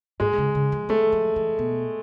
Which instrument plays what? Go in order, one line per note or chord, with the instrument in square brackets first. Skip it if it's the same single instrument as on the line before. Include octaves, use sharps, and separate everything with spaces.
[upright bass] G#2 [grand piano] G#3
[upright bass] C#3
C#3
F3
[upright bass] F#3 [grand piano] A3
[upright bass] F3
E3
B2